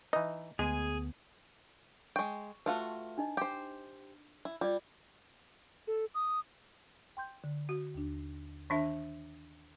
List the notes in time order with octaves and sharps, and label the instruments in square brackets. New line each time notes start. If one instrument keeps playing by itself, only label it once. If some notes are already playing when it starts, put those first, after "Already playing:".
[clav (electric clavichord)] E3 D#4 [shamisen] D#5
[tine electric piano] D2 D3 B3 [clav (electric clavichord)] G#3 [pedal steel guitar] G#4 G#5
[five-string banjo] G#3 G5 [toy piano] C#6
[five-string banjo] A3 F4 F#4 [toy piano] B4 A5
[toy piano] D4 D#4 D#5
[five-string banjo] G4 C5
E4
[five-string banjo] G3 [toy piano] F4 D5
[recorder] A4
D#6
[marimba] G5 C6 G6
D3
[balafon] F#4
[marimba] D#2 D4
[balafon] D#3 D4 E5 [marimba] A5